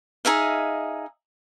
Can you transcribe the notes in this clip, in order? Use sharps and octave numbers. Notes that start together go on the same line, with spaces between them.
D#4 G#4 E5 F5